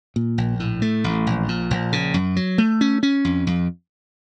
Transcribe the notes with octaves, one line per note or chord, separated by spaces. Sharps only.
A#2
A#1
A2
A3
A1
A#1
A#2
A#1
C#3
F#2
F#3
A3
C#4
C#4
F2
F2